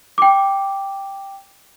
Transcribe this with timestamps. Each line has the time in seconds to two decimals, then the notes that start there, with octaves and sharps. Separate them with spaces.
0.18 G5 D6